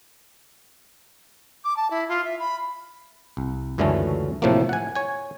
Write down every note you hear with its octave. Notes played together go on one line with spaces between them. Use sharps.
D6
A5
E4
F4
E5
B5
C2
C#2 F#2 D3 E3 A3 C#4
A2 C3 F3 F#3 A3 A#3
F#5 G#5
C#5 G#5